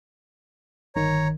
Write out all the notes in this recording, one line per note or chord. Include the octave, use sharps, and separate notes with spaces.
G1 D#3 C#5 A#5